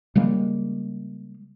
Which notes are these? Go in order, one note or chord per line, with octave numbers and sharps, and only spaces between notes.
C#3 G3 G#3 A#3